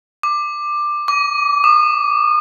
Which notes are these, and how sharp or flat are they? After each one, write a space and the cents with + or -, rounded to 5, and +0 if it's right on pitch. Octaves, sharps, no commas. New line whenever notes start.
D6 +15
D6 -25
D#6 -45